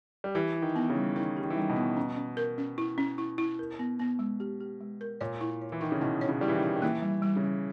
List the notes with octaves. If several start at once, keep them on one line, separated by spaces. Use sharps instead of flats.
G3
E3 G4
E4
D#3
B3
C#3
G3
D#3 E4
G4
D#3
E3
D#3 G3
B2
B3
C#4
C#4
A#4
C#4
E4
C#4
E4
E4
A#4
B3
B3
G#3
G4
G4
G#3
A#4
A#2 C#5
E4
C#5
E3
D#3 E4
C#3
B2 E4
C#5
C#3
G3 E4
E3
D#3
E4
D#3
E3 A#3
G3
G3
C#3
G3